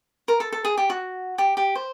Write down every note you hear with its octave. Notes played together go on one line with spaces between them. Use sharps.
A#4
A4
A4
G#4
G4
F#4
G4
G4
C5